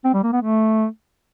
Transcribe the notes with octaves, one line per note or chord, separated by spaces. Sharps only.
C4
G3
A#3
B3
A3